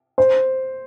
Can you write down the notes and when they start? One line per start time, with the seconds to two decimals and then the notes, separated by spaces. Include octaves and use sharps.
0.18 C5